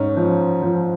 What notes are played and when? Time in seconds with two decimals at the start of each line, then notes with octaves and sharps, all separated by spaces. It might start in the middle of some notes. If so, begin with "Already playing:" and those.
Already playing: G#2 C#4
0.17 F3
0.62 F3